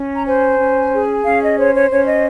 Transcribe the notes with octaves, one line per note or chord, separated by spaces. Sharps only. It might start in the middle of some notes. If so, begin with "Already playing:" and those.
Already playing: C#4
A#5
C5 G#5
C#4
G#4
C#4 F5
D#5
C5 C#5
C#5
C#4 C#5
D#5